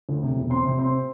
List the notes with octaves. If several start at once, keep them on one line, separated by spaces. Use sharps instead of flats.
D2
C3
E1
C4 C6
C3
C4 C6